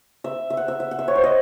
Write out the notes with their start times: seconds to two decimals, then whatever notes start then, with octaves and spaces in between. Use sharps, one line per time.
0.24 E5
0.50 E5
0.57 F#5
0.68 E5
0.80 E5
0.91 F#5
0.99 E5
1.08 C#5
1.15 C5
1.24 D#5